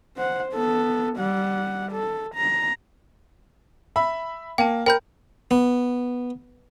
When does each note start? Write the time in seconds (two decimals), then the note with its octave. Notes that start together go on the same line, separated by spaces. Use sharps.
0.17 C5 F#5
0.53 B3 A4
1.18 G3 F#5
1.92 A4
2.35 A#5
3.96 E5 B5
4.58 A#3 G5 A5
4.86 A#4 G5 B5 G6
5.51 B3